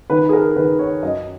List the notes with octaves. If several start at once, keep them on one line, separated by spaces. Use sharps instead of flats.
D#3 B4
G#4
A#4
D#3 B4
C#5
F#2 D#5